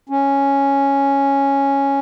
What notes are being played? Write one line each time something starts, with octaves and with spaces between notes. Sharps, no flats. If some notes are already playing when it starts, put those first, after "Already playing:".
C#4